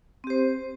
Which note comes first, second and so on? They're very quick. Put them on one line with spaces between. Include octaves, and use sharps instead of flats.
C4 G4 C5